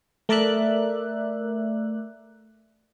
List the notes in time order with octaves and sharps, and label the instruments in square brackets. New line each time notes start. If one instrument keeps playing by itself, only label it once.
[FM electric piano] A3 A#4 D5 E5 F#6